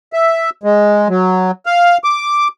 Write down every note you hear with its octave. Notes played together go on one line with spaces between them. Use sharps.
E5
G#3
F#3
F5
D6